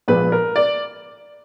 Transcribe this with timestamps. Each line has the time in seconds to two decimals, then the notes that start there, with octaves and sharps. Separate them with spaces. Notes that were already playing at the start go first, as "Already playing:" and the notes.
0.08 A#1 A#2 F3 G#3 B3 B4
0.32 A#4
0.56 D5